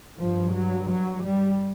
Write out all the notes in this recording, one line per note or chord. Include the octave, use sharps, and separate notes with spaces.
G2 F3
F#3
F#3
G3